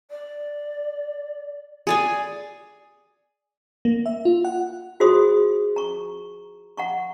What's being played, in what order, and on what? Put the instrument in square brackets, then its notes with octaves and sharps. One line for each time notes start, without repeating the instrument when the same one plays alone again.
[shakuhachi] D5
[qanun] G#4 D5 G#5
[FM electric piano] A#3
E5
F4
F#5
[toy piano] F4 F#4 G#4 C5 C6 D#6
A#5 C#6
F#5 A#5 C#6